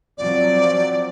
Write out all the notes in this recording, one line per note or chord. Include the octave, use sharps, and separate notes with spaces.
F3 F#3 C4 D5